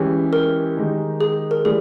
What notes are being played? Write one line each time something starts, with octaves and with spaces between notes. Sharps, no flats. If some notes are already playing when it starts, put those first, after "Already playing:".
Already playing: E3 G#3 C#4 G4
A#4
D#3 G#3 D#4 G4
G#4
A#4
E3 G3 G#4